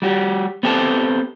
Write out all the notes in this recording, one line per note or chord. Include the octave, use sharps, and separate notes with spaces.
G3 F#4 G4
B3 C4 G4 A4 A5